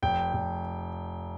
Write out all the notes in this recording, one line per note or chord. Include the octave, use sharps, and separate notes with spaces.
F1 G5
F1